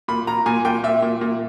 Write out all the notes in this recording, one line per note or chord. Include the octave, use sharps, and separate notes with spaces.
A#2 B5
A#2 A#5
A#2 G#5
A#2 G5
A#2 E5
A#2
A#2